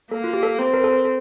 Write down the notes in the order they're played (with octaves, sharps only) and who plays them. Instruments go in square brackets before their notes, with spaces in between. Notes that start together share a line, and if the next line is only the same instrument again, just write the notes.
[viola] A#3 [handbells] A4
[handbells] F4
G4
A4
[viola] C4
[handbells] A#4
A4
A#4
A4